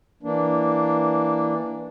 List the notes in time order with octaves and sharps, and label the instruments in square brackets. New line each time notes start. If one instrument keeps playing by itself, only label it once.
[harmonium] E3 A#3 D4